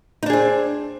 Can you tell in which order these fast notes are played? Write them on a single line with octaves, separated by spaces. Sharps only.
D#4 D4 G#4 C4